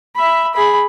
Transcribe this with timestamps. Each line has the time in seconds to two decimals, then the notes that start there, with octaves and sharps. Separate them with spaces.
0.16 E5 B5
0.54 G#4 B5